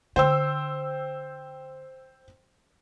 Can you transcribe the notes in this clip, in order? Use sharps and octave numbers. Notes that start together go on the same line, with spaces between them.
D3 C5 G5 E6